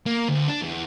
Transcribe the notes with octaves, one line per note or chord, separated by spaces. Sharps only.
A#3
D2
D4
E2